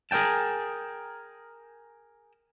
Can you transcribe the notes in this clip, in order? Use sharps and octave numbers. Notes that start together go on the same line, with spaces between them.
G#4 A#4 D#5 G5 A5